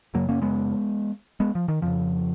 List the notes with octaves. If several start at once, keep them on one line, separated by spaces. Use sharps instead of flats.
F#2 C#3 F#3 A#3
A#3 C#4
G#3 B3
G#3 B3
F3
D#3
F2 C#3 F3